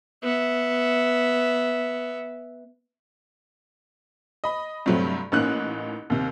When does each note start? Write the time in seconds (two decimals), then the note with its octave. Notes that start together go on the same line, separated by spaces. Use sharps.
0.23 B3 E5
4.44 D#5 B5
4.86 G2 C3 F#3 A3 C4
5.32 A1 A#3 C#4 D#4 F#6
6.10 D#2 C3